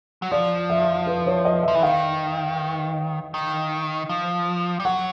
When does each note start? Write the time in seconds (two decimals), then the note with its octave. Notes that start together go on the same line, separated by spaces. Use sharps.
0.22 F#3
0.31 F3 D5
0.70 E5
1.06 B4
1.26 C#5
1.45 D#5
1.63 F3 E5
1.75 E3
1.83 D#3 F5
3.34 D#3
4.09 F3
4.80 G3
4.85 F#3 F#5